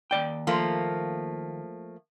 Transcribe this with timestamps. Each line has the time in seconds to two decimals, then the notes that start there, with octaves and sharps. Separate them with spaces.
0.11 D#2 D5 G5
0.47 F3 A3 A#3